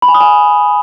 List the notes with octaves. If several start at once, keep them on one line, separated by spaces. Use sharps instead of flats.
B5
G#5
D#6
G#5